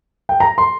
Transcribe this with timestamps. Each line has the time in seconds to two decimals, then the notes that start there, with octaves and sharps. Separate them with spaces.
0.29 G5
0.40 A#5
0.58 C6